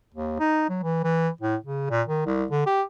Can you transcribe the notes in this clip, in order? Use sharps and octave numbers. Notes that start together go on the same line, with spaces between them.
D#2
D#4
F#3
E3
E3
A2
C#3
A#2
D#3
C2
D3
G4